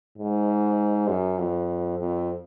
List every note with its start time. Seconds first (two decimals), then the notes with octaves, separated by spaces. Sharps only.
0.18 G#2
1.08 F#2
1.38 F2
1.98 F2